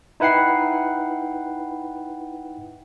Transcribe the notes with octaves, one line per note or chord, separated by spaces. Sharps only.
D#4 E4 B4 F#5 G5 C7